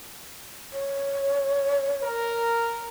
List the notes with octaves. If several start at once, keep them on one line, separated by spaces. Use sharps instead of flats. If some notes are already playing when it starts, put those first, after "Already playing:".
C#5
A#4